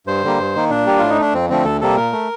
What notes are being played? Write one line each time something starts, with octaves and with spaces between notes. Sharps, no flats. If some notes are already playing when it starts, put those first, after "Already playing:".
G2 C5
D3 G3 A#3
G2
D#3 A#3
A#2 D4
G3 A#3 G4
A2 F4
D#4
A3 D4
F2 C4
D3 F3 A3 C4
D2 A4
C3 G3 A#3 A4
A#2 A#4
A3